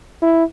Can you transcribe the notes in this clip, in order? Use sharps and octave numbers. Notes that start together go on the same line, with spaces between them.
E4